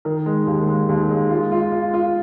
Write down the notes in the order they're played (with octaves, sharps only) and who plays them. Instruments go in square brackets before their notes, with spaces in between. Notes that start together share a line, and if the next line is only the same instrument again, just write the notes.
[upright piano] D#3
G#3
D#2
G#3
D#2
G#3
F4
F4
F4
F4